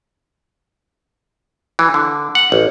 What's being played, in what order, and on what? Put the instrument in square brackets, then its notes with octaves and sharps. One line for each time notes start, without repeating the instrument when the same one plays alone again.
[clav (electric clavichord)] E3
D3
F#5
A1